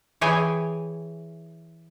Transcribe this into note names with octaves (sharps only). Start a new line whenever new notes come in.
E3 E4 G#4 C#5 G5 G#5